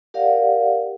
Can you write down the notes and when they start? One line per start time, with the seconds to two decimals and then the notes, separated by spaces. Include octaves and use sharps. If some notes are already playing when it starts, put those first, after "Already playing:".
0.14 G4 A#4 D5 F5 F#5